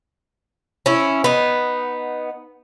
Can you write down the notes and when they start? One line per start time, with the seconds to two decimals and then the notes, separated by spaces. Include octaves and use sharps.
0.86 C#4 E4
1.24 B3 D#4